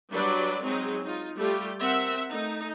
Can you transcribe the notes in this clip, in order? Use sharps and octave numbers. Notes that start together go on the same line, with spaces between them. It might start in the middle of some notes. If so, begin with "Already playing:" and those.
F#3 G3 D4 B4 D5
F#3 G#3 C4 D#4 G#4
D#4 F4
G3 A3 F4 G4
C4 A#4 E5 F#5
A3 D#4